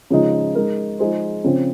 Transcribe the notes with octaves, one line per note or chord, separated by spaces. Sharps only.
C#3 F3 G#3 D#4
G#3 D#4 A#4
F3 G#3 D#4 G#4 C5
C#3 F3 C4